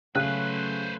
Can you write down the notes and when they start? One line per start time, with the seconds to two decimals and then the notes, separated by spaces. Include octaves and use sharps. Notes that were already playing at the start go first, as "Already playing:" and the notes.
0.15 C#3 F#3 A3 C#4 B4 C5 F#6